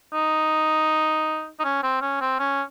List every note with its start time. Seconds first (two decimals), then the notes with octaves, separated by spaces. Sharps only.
0.13 D#4
1.59 D#4
1.64 C#4
1.83 C4
2.02 C#4
2.21 C4
2.39 C#4